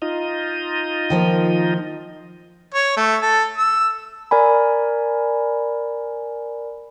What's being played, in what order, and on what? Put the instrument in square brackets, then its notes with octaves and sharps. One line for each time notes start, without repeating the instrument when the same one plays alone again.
[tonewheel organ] D#4 F4 D#5
[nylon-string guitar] D#3 F3 A#3
[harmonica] C#5
A3
A4
E6
[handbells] A#4 D5 G#5 B5